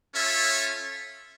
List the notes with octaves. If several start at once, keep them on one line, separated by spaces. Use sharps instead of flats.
C#4 F4 A4 C#5 E5